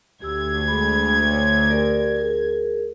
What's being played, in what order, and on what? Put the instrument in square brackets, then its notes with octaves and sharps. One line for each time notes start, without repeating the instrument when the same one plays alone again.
[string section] D2 G#6 [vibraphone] G4 E6
[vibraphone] G#3 G#4 B5
C#5
G4 A#4 D5
G#4 A#4